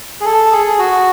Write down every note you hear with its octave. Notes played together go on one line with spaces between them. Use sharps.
G#4
A4
G#4
F#4